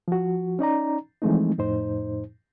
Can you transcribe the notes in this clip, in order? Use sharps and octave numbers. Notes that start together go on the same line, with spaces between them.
F3 F#4
C#4 D#4 D5 A#5
E3 F3 G#3 A3 C4 D#4
F2 A2 D#4 C5